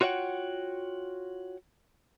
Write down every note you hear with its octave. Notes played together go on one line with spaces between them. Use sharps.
F4 F#4 C#5 E5 F#5 G5